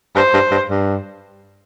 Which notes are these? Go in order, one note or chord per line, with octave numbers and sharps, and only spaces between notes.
G2 C5
G2
G2
G2